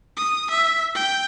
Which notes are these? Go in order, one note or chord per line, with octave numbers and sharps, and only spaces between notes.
D#6
E5
G5